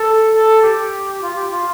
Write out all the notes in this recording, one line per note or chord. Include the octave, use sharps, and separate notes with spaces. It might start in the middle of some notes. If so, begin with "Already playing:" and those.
Already playing: A4
A4
G4
F4
G4
F4